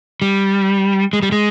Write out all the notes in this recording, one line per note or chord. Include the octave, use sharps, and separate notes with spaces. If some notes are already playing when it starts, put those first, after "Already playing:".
G3
G#3
G3
G#3